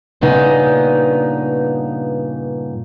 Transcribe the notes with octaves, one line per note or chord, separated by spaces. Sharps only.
G2 A#2 C#3 B3 D#4